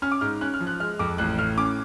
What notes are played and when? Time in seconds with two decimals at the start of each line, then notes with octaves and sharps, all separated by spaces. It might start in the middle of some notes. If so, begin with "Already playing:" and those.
0.02 C#4 F6
0.12 D6
0.21 G#2 F6
0.41 C#4 F#6
0.54 F6
0.60 F3
0.67 F#6
0.80 G#3 F6
0.99 F2 D6
1.18 A1 F#6
1.38 A2 F6
1.57 C#4 D6